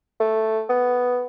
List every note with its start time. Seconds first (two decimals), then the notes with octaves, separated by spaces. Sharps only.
0.20 A3
0.69 B3